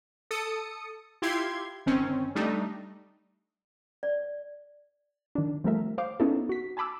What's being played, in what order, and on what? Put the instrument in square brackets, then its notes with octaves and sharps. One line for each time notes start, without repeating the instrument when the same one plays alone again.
[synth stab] A4 D#6 C#7
E4 F4 G4 C6 G#6
G1 D#3 C4 C#4
G3 A3 D4 D#4
[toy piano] D5
[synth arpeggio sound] D#3 D4
F3 G3 A3 A#4 E5
C5 F5 D6
B3 C#4 D#4 E4 G#4 A4
F#4 B6
G#5 A5 B5 D6 E6